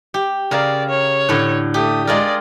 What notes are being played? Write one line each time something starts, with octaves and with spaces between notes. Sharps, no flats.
G4
C#3 A#4 D5 F5
C#5
A2 D3
A3 G4 D#6
G#3 F4 A#4 D5 D#6